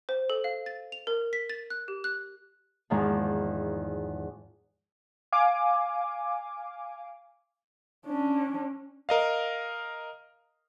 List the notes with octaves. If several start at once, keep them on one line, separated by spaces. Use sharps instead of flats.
C5
A4
F5
A6
F7
A#4
B6
A6
F#6
G4
F#6
E2 G#2 D#3 F3
F5 G#5 D6
C#4 D4
A#4 D#5 F5